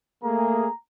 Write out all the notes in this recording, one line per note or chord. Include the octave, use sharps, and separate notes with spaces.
A3 A#3 G#4 A#5